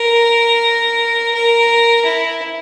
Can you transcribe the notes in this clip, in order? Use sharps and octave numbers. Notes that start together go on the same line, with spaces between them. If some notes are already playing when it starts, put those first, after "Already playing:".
Already playing: A#4
A#4
E4